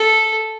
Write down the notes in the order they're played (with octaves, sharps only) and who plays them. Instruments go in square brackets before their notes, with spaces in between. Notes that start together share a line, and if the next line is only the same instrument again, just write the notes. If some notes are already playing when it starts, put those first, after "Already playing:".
Already playing: [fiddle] A4